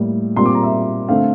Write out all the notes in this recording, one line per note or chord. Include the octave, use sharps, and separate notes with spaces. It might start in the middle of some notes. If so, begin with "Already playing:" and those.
Already playing: A2 G3 A#3
A#2 G3 C4 C6
D6
A#5
E5
D3 A3 C4 F5